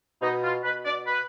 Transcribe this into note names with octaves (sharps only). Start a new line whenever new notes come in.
B2 D#4
F4
B2 B4
D5
B4